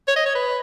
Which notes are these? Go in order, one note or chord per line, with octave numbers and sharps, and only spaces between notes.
C#5
D#5
C#5
B4